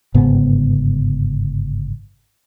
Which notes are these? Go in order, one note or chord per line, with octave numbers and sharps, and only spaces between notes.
G1 G#2 C#3 B3